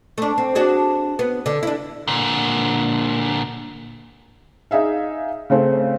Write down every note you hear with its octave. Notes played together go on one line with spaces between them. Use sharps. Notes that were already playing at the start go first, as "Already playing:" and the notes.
A3 D4
C4
D4 F#4 G#4
B3
D3
D4 E4
A#2 D3
D#4 G#4 E5 F5
C#3 A3 C4 C#4